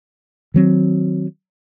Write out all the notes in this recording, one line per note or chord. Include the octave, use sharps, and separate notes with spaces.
D#3 F#3 C4